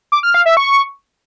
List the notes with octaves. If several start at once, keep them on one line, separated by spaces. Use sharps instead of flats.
D6
F6
F5
E5
C#6